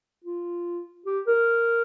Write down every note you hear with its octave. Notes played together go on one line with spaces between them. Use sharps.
F4
G4
A#4